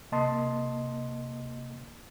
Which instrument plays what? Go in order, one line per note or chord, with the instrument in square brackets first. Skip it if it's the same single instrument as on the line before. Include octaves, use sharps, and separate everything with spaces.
[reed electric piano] C3 A#3 D#5 A5 C6